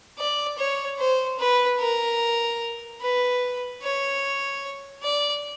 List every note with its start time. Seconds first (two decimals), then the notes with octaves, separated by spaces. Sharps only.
0.18 D5
0.58 C#5
0.99 C5
1.39 B4
1.79 A#4
3.02 B4
3.82 C#5
5.03 D5